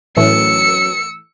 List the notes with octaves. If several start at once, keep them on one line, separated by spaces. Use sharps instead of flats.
A2 E3 F#3 A3 B3 C#4 E6 C#7